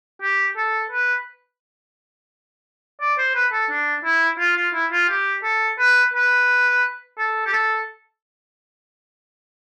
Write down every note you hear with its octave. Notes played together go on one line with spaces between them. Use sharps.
G4
A4
B4
D5
C5
B4
A4
D4
E4
F4
F4
E4
F4
G4
A4
B4
B4
A4
G4
A4